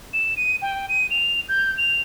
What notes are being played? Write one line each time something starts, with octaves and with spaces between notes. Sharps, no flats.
E7
D#7
G5
D#7
F7
G6
F7